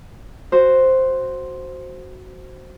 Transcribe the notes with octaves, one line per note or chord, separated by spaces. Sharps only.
F#4 C5